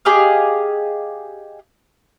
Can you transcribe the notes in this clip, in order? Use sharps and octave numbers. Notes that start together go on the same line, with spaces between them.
G4 G#4 D#5 F5